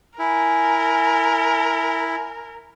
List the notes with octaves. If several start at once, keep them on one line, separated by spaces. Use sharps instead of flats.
E4 A#4 G#5